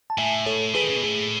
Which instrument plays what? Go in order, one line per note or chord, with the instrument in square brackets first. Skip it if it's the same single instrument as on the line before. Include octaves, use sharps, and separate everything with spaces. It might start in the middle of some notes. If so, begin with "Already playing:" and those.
[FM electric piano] A5
[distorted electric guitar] A2 [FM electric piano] E5 G#5
[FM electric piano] A4 C#5
[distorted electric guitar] E3 [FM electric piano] G#4 B4
[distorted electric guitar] D#3
C#3
B2
[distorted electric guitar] A2 [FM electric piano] G#4